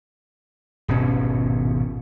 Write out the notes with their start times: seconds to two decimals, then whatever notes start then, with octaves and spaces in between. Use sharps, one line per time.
0.88 D#1 G#1 B2 C#4